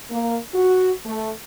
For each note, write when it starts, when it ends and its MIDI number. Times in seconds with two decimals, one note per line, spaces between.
0.10 0.37 58
0.54 0.92 66
1.06 1.30 57